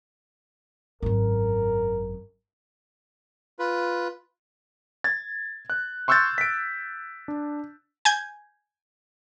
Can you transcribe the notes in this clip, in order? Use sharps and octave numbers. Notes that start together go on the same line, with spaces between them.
G#1 F#2 A#4
F4 B4
G#6 A6
F#6
C6 C#6 E6 F#6 G6 A6
B6 D7
D4
G#5 G6 G#6